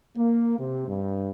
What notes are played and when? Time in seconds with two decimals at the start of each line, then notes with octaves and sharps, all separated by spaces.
0.17 A#3
0.59 C3
0.88 G2